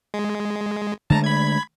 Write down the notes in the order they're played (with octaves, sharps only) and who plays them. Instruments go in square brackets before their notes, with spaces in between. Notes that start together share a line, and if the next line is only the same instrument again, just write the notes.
[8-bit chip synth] G#3
[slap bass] D3 G#3 A3 [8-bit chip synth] A5 A#5
[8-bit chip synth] B5 G#6